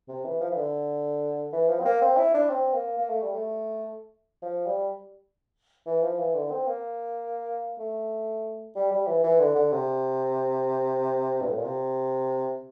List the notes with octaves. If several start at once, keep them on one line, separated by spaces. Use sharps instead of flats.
C3
E3
F3
E3
D3
E3
F3
C4
A#3
C4
E4
D4
C4
A#3
A#3
A3
G3
A3
F3
G3
E3
F3
E3
D3
C4
A#3
A3
G3
G3
E3
E3
D3
D3
C3
G2
A2
A#2
C3